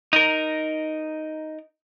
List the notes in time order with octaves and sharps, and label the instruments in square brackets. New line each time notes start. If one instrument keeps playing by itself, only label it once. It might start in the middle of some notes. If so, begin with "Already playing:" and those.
[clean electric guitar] D#4 A#4